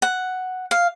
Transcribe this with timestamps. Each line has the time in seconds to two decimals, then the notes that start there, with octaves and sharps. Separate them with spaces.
0.02 F#5
0.71 F5